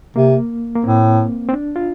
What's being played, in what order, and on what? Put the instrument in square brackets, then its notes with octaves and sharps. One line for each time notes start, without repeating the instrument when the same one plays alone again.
[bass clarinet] C3 [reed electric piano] A#3
[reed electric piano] A#3
[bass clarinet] A2 [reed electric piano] C4
[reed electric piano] C4
D4
F4